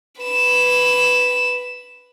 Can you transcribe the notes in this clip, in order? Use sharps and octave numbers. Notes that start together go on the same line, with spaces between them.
B4 E7